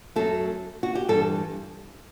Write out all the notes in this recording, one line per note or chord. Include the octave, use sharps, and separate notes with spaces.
F#2 F#3 A3 A4
F#4
G4
G2 E3 G3 A4